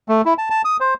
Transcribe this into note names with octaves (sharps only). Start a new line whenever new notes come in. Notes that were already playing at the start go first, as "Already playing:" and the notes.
A3
E4
A5
A5
D#6
C5